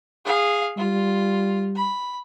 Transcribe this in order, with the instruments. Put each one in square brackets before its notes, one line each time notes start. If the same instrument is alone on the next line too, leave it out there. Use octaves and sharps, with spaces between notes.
[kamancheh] G#4 F5
[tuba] G3 [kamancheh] F4
[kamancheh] B5